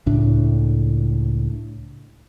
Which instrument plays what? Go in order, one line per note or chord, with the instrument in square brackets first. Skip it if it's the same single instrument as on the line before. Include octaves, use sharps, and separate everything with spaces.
[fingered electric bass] C#2 A2 D4